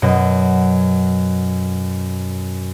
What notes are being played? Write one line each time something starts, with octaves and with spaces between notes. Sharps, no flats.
F#2 B2